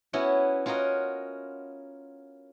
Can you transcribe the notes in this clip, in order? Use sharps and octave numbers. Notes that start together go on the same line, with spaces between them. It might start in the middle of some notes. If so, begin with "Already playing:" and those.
B3 C#4 E4 F#4
C#4 F4 F#4 A#4 D#5